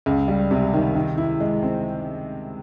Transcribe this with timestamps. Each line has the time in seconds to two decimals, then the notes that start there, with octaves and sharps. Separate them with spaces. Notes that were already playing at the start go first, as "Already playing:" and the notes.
0.06 C#2
0.28 G3
0.51 C3
0.74 D#3
0.96 D#3
1.18 E4
1.40 G#3
1.63 C4